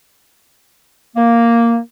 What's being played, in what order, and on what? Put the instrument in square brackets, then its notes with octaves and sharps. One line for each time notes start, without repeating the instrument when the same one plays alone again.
[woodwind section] A#3